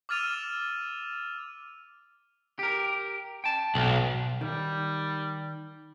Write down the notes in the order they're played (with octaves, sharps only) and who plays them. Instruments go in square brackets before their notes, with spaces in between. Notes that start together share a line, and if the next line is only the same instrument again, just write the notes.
[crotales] D6 E6 F6 A6 D#7 F7
[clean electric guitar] G4 A#4
G5 A5
[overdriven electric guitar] B1
[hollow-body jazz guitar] D#3 [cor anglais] G3